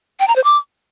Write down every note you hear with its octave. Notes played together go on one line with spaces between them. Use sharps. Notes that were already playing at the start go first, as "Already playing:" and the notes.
G5
A#5
C5
D6